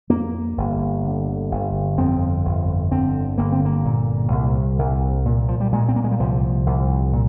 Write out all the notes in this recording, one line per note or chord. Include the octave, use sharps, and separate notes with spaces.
F2 A#3
G1
D3
G1
F2 C4
G1
D3 C4
G1 A#3
C4
A#3
A#2
C2
C2
A#2
F3
G3
A#2 G#3
C4
A#3
G#3
G3
C2 F3
C2
A#2